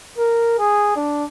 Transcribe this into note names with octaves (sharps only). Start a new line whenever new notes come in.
A#4
G#4
D4